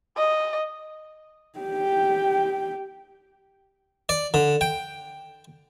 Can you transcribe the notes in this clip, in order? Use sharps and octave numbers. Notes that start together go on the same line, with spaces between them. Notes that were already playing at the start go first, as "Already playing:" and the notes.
D#5
G4 G5
D5
D3
G5